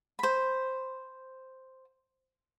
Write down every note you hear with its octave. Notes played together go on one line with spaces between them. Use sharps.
C5 B5